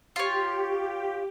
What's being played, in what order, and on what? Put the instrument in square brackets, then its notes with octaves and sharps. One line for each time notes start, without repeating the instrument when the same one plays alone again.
[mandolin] F4 C#5 [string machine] G4